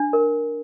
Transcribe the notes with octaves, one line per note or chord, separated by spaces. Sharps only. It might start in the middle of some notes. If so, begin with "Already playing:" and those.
Already playing: D4
A#4